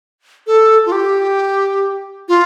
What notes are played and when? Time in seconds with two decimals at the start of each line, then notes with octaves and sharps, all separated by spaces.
0.47 A4
0.86 F4
0.92 G4
2.28 F4